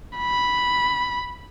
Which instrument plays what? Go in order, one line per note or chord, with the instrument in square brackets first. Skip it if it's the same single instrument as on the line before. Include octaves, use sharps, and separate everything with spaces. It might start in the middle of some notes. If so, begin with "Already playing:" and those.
[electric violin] B5